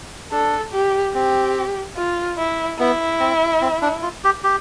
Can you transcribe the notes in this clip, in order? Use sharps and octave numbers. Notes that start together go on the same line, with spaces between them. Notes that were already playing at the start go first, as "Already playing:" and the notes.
D4 A4
G4
C4 G4
F4
E4
B3 E4
C4
C4
D4
F4
G4
G4